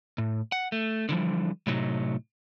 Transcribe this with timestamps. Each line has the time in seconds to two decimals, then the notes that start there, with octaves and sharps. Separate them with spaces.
0.18 A2
0.52 F#5
0.72 A3
1.09 D3 E3 F3 G3
1.67 A2 C3 F#3 D#4